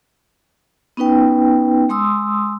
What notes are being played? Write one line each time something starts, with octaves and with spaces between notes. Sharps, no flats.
B3 C#4 D#4 B4 G5
G#3 C6 D#6 E6